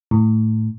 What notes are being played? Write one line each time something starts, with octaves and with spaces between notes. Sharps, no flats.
A2